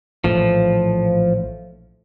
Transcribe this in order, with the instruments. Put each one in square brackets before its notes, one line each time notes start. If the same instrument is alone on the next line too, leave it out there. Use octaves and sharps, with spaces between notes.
[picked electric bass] A#1 A2 E3 [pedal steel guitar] F3